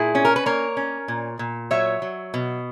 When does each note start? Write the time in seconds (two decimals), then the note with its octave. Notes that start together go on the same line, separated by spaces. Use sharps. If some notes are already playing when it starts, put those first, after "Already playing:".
Already playing: A#2 E4 G#4
0.15 C#4
0.25 A#4
0.36 B4
0.46 A#3 A#4 C#5
0.77 C#4
1.08 A#2
1.39 A#2
1.71 F#3 C#5 E5
2.02 F#3
2.34 B2